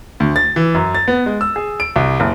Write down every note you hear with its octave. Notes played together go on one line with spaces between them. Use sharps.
D2
A6
E3
F#2
A6
B3
G#3
E6
G#4
D7
C2
F#1